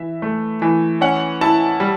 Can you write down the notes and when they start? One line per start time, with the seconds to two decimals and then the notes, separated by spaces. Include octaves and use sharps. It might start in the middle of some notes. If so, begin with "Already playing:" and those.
Already playing: E3 E5
0.22 A3
0.62 E3
1.01 C#4 F#5
1.41 E4 A5
1.80 G3